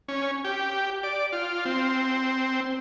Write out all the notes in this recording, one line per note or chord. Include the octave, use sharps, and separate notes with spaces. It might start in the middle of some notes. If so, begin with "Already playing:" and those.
C#4
G4
D5
F4
C4